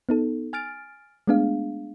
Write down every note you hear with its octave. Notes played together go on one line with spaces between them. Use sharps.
B3 D#4 A4
G#5 F6 A6 D7
G#3 A3 B3 D4 G#4 F5